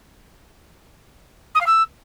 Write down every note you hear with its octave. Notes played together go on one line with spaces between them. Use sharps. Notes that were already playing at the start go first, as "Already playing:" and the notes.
D#6
F5
E6